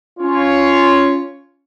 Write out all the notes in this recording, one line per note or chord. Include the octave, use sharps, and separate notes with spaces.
C#4 F4 C#5